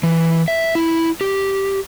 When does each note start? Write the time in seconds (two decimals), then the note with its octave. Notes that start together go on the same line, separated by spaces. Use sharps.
0.03 E3
0.48 E5
0.75 E4
1.21 G4